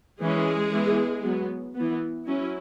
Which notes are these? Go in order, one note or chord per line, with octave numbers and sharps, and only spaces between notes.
E3 G#3 C#4 G#4
E3 B3
F#3 B3
E3 B3
F#3 C#4 E4